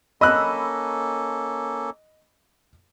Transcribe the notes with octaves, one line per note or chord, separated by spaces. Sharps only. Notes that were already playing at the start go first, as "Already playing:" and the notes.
A#3 C#4 A4 D#5 B5 E6 F#6